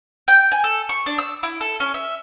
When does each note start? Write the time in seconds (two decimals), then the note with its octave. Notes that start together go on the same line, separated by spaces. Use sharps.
0.28 G5
0.52 G#5
0.64 A4
0.89 C#6
1.06 D4
1.18 E6
1.43 E4
1.61 A4
1.80 C#4
1.94 E5